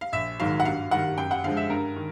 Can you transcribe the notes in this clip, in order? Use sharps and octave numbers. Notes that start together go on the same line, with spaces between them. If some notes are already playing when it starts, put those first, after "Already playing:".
F5
A#1 E5
G#2 D#3 F#3 F5
F#5
G2 F5
D#3 G3 F#5
F#2 G5
F#5
D3 F3 G#3 F5
E5
G2 A#4
D#3